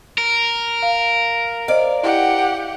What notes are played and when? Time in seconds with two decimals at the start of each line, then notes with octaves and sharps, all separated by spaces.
0.18 A#4
0.82 F5
1.68 C5 D5 D#5 F5 D7
2.03 E4 G4 F#5